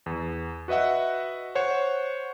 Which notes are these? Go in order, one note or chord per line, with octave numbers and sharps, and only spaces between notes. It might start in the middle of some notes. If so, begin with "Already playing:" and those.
E2
F#4 B4 D#5 E5 F#5
C5 C#5 F#5 C#6